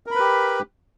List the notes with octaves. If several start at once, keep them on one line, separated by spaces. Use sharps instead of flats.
G4 A#4 B4 B5